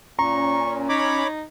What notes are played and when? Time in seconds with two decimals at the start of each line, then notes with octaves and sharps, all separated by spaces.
0.19 A#2 C#4 A#5 C#6
0.89 D#4 C#5 B5 D6